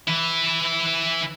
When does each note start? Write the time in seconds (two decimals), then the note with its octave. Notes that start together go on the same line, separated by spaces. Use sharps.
0.08 E3 E4